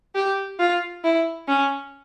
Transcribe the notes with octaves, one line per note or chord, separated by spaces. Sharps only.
G4
F4
E4
C#4